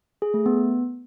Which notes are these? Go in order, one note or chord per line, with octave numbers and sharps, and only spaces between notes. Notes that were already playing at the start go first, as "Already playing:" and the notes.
G#4
A3
B3